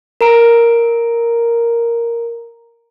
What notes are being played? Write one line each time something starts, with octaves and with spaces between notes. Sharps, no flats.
A#4 A#5 D7